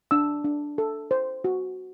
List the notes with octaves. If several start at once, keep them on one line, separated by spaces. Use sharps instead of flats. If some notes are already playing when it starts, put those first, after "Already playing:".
D4 E6
D4
A4
C5
F#4